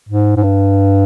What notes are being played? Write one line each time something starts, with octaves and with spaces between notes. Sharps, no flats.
G#2
G#2
G2